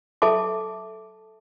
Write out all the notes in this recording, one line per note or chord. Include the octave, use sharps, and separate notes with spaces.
A4 E5 A5 D6